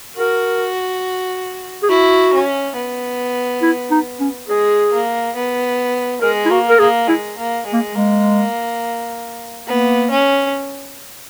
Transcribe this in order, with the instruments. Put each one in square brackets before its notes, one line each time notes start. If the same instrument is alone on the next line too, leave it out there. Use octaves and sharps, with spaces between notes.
[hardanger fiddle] F#4 [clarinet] A#4
[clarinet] G#4
[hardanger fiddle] E4 [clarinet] F#4
[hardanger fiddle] C#4
B3
[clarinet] E4
D#4
C#4
[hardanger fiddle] G#3 [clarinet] G#4
[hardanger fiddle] A#3
B3
[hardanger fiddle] G#3 [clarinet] A#4
[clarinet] E4
[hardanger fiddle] A#3 [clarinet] F#4
[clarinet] A#4
[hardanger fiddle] A#3 [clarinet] G#4
[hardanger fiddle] G#3 [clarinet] E4
[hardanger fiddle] A#3
G#3
[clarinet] A#3
[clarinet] G#3 [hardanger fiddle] A#3
[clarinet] A#3 [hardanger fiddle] B3
[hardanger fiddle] C#4